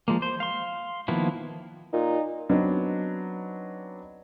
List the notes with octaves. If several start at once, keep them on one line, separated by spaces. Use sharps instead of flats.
F3 G#3 A#3
C5
F5 C6
D#3 F3 A#3 B3 E4
A#2 D#4
F#3 B3 C4 D4 D#4